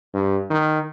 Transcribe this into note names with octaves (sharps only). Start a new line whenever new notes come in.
G2
D#3